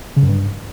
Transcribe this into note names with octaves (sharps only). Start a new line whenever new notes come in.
C#3
F#2
G2